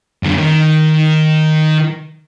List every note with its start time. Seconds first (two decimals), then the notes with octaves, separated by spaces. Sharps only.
0.23 F#2 D3
0.38 D#3